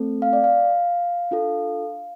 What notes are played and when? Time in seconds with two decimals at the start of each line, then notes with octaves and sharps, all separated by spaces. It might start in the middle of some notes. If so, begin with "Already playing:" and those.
Already playing: A3 C4 A4
0.22 F5
0.33 D5
0.44 F5
1.31 D4 F4 A4